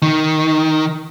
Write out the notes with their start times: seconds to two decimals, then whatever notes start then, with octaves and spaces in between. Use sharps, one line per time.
0.02 D#3